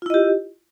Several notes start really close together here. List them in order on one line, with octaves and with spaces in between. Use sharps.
F4 E4 D#5 G4